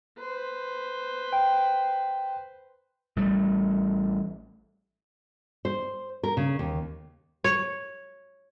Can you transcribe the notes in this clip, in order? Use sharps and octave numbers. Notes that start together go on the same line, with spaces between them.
B4 C5
G5
A1 G3 A3
C5
A#4
C#3
D#2
C#5